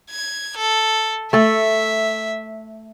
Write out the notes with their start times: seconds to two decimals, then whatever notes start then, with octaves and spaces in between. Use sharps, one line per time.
0.10 G#6
0.57 A4
1.33 A3 A4 E5